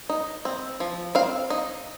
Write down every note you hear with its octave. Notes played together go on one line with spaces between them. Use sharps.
D#4
C4
F3
C4 F5
D#4